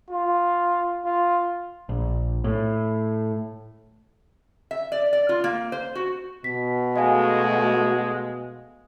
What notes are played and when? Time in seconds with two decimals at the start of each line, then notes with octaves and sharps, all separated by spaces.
0.11 F4
1.05 F4
1.89 A#1
2.44 A2
4.71 E5
4.92 D5
5.13 D5
5.29 F4
5.44 A#3
5.72 C5
5.95 F#4
6.44 B2 B6
6.96 G#3 A3 F#4 D#5 F5 G#5